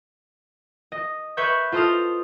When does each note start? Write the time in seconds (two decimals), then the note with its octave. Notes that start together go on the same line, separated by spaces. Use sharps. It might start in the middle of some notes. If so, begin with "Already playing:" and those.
0.92 D#5
1.37 B4 C#5 E5 C#6 G6
1.72 F4 A4 C5 D#5 D#6 F6